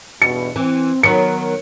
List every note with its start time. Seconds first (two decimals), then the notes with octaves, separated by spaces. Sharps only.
0.22 E2 G2 B2 C#7
0.56 E3 C4
1.03 D#3 F#3 B3 A#4 C#7